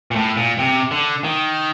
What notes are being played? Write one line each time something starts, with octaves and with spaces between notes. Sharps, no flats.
A#2
A2
A#2
C3
D3
D#3